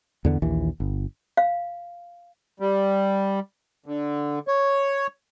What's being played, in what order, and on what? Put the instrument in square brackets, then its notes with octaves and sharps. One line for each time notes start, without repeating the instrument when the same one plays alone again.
[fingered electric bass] E2 D3 B3
A#1 D#2 E3
G1
[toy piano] F5
[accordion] G3
D3
C#5